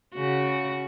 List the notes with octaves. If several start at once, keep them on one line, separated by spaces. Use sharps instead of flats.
C#3 F#4